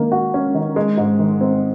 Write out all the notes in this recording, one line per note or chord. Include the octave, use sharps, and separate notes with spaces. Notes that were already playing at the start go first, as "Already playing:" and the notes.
Already playing: D#3 A#3
F#4
C#4
D#3
G#3
G#2
D#3
C4